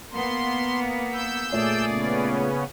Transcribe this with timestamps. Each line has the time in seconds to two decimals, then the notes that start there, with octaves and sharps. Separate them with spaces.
0.12 A#3 B3 C6
1.12 E6 G6
1.52 A#2 A3 G#4 C#5 D5
1.87 C#3 B3 C#4